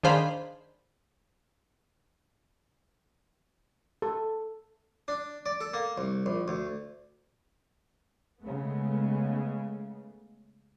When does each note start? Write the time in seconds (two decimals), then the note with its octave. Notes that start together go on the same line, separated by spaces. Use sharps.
0.03 D#3 D4 G#4 C5 F5 B5
4.02 A4
5.08 D4
5.46 D5
5.61 A4
5.74 A#3
5.98 C2
6.26 A#1
6.48 D2
8.41 C#3 G#3 A3 B3